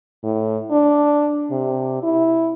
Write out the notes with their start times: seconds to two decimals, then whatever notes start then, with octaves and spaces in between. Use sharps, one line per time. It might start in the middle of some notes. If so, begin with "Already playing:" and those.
0.24 A2
0.71 D4
1.51 C3
2.03 E4